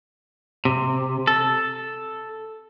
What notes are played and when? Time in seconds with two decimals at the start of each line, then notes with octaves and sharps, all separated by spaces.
0.65 C3
1.27 A4